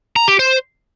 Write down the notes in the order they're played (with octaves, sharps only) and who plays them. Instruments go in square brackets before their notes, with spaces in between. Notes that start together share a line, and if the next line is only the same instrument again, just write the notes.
[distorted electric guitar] A#5
G4
C5